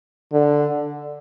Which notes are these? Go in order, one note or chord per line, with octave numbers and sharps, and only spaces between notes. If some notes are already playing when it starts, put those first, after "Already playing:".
D3